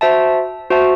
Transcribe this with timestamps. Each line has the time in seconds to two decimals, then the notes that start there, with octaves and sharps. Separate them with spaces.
0.01 F#4 C5 E5 A5
0.70 F#4 C5 E5 A5